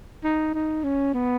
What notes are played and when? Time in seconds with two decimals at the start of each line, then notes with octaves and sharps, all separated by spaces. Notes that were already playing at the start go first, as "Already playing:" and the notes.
0.24 D#4
0.54 D#4
0.84 C#4
1.13 B3